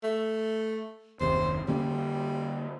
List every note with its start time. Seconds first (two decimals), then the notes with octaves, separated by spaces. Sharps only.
0.04 A3
1.20 F#1 D#2 C3 C5
1.68 D3 G3 A#3 C#4